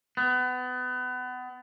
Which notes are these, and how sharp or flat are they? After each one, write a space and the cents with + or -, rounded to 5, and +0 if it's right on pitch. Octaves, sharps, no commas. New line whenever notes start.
B3 +30